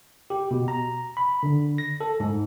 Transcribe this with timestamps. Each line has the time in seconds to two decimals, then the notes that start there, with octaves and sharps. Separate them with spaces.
0.30 G4
0.51 B2
0.68 A#5
1.17 B5
1.43 D3
1.78 A#6
2.01 A4
2.20 G#2